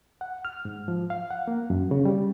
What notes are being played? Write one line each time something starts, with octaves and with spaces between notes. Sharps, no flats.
F#5
F6
G#2
F3
F5
F#5
A#3
F#2
C#3
G3